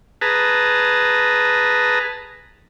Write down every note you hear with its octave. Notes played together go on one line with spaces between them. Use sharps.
G#4 B4 A5 A#5